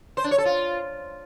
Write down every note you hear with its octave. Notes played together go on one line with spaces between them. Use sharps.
C5
D4
C#5
A4
F4